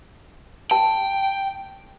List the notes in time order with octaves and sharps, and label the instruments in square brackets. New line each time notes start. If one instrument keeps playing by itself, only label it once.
[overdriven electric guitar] G5 [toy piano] A5